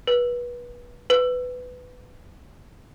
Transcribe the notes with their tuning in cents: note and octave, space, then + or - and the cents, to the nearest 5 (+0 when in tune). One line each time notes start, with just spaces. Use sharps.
B4 -25
B4 +15